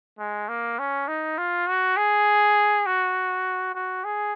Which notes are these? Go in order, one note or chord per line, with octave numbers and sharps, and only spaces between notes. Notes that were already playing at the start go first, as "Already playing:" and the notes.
G#3
A#3
C#4
D#4
F4
F#4
G#4
F#4
F#4
G#4